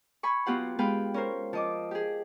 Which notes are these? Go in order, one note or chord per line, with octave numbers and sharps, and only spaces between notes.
G#5 B5 C#6
F#3 B3 F4 G4 F#5 C6
G#3 B3 B4 F5 G5
C#4 A#4 C5
F3 D#5 D6
G4 G#4